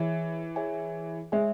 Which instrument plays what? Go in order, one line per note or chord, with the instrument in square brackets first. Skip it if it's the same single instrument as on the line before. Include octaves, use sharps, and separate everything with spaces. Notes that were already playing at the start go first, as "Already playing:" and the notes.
Already playing: [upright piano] E3 [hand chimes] G#4 C#5 E5 G#5
[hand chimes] G#4 C#5 E5 G#5
[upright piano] G#3 [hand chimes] G#4 C#5 E5 G#5